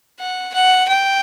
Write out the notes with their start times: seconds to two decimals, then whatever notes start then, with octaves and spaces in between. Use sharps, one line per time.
0.19 F#5
0.54 F#5
0.88 G5